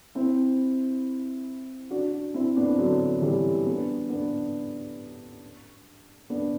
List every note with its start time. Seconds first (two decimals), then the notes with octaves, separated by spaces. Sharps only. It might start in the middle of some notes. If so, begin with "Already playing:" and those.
0.15 C4 E4
1.90 D4 F#4
2.34 C4 E4
2.56 B3 D4
2.78 D3 F#3
3.22 E3 G3
3.66 B3 D4
4.10 B3 D4
6.30 B3 D4